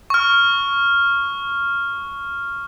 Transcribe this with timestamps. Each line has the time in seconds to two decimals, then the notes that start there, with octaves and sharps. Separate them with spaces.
0.10 C#6 F6